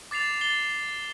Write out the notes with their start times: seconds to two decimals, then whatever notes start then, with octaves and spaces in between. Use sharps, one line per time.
0.11 D6 A6 C7 F7
0.41 A6 C7 G7